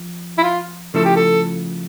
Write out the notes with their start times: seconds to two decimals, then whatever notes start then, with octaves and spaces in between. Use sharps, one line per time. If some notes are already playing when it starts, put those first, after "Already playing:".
Already playing: F3
0.38 E4
0.43 F4
0.94 C#3 F3 A3 E4 A4
1.05 G4
1.16 A4